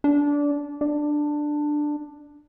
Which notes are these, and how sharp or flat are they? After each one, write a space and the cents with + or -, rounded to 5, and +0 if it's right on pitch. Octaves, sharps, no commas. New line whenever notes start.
D4 -20
D4 +10